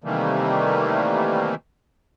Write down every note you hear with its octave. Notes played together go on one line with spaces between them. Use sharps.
C3 D#3 E3 G3 A3 A#3